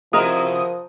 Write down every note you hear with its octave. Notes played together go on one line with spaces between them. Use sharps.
C3 F3 E4 F#4 A#4 D#5 A#5 D#6